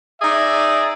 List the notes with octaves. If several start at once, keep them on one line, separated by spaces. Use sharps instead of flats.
D#4 G#4 D5 E5